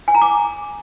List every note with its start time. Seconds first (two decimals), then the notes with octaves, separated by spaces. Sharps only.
0.08 G#5
0.15 A#5
0.22 D6